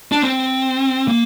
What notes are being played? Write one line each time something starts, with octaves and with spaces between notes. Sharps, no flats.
D4
C4
A#3